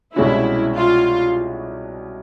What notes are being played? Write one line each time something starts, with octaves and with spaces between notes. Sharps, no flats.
C2 B2 G#3 C#4 E4 F#4
F4